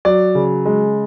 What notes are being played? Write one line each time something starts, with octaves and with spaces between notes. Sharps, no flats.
F#3 D5
C#3
G#3